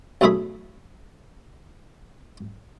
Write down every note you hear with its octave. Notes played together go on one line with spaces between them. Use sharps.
B1 F#2 A3 E4 G#4 B5